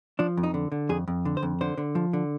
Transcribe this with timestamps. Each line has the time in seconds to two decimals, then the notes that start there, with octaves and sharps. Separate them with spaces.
0.19 F3 D4
0.37 F2
0.43 D#4
0.54 D3
0.72 D3
0.89 F2 G#4
1.08 F2
1.25 D3
1.37 C5
1.43 F2
1.61 D3 C5
1.78 D3
1.95 F3
2.13 D3